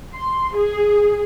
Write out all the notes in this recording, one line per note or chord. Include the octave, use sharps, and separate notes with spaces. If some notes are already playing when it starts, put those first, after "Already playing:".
C6
G#4